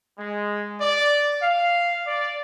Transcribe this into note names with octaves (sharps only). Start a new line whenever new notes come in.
G#3
D5
F5
D5